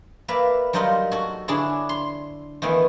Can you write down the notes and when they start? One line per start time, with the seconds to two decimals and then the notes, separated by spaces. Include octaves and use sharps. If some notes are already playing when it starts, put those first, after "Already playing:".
0.28 A#3 B4 D5 E5 F5
0.73 F#3 G3 D#4 F4 A#4 F#5
1.12 F#4 A4
1.48 D3 D4 E4 G#4 C#5
1.89 C6
2.62 D#3 E3 A3 B3